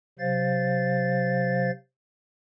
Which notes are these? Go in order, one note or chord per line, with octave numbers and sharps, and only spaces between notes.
C3 F#3 C5 F5 A6